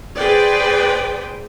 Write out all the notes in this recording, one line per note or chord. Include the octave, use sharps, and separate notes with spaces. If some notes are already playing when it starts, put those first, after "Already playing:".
G#4 B4 C5 D5 G5